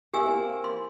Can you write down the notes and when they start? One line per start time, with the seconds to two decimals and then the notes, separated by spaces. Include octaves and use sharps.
0.14 A#3 E4 G4 A#4 G#5 E6
0.26 A#3 C4
0.64 C6